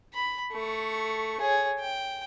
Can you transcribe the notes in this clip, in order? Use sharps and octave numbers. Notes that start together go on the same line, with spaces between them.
B5
A3 C#6
G#4 C#5
G5